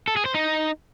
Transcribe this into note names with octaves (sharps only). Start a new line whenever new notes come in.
A4
G#4
C5
D#4